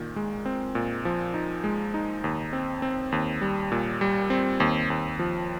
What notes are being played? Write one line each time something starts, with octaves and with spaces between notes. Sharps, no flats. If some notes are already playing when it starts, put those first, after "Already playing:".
Already playing: A#2 D#3
G#3
C4
A#2
F3
D#4
G#3
D#4
D#2
C4
C4
D#2
G3
A#2
G3
C4
D#2
D#2
F3